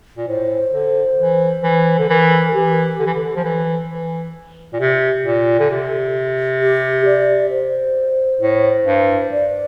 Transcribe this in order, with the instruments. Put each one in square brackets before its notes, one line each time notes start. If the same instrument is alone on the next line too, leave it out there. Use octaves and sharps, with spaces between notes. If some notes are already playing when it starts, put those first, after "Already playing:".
[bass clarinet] A#2
[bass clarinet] A2 [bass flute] C5
[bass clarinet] D3
E3
E3
D3
[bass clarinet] E3 [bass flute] A#4
[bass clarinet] E3 [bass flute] G4
[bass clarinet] D3
E3
D3
F3
E3
E3
A#2
C3
A#2
D3
C3
[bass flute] G4
D5
C5
[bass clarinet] A2
G2
[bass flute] D5